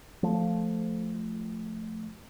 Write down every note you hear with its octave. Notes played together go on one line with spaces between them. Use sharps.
F3 A3